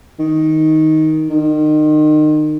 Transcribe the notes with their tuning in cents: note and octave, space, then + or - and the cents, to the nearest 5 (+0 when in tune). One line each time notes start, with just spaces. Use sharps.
D#3 +10
D#3 -30